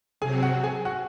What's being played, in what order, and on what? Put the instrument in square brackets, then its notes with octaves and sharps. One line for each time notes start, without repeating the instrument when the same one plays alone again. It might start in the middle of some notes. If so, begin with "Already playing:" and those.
[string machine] C3 F#3 C4 [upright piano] G#4 G#5
[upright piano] F#4 F#5
G#4 G#5
F#4 F#5